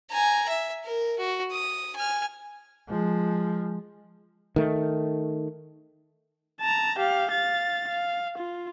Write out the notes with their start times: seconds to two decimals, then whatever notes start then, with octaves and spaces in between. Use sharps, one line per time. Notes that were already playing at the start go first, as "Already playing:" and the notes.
0.11 G#5 A#5
0.49 E5
0.85 A#4
1.19 F#4
1.52 D#6
1.96 G#5 F6
2.89 F3 G#3
4.56 D#3 A3
6.61 A5 A#5
6.99 G4 F5
7.30 F5 A6
7.88 F5
8.38 F4